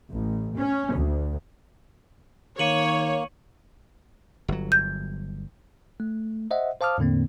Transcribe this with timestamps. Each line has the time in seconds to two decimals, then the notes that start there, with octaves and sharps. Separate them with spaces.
0.15 A1
0.57 C#4
0.95 D2
2.59 D#3 A#3 C#5 C#7 D#7 F#7
4.48 G1 F#3
4.72 G6
6.00 A3
6.51 C5 D#5 E5 F#5
6.81 C5 F5 A5 D6 D#6 F6
6.98 E2 A2 D3 A#3 C4